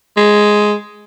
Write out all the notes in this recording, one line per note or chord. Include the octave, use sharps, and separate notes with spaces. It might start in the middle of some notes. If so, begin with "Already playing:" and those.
G#3